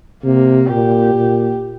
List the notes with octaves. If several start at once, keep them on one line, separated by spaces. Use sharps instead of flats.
C3 A#3
A#2 G4
A#2